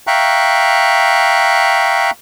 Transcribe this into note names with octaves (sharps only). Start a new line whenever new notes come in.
E5 F5 G5 A#5 C#6 F#6